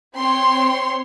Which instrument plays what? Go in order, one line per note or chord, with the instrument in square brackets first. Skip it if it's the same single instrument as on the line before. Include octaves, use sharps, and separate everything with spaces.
[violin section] C4 C#5 C6